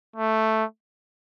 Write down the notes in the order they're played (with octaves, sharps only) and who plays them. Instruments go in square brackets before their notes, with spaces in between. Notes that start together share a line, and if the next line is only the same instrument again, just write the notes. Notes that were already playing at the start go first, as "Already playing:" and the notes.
[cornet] A3